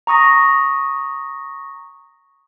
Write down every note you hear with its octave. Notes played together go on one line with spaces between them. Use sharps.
A#5 C#6 D#6 A#6